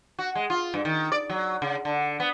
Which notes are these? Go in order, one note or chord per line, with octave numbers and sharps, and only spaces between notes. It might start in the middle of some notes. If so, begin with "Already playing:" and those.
F#4
G#3
F4
G2
D#3
D5
F#3
C#3
D3
B3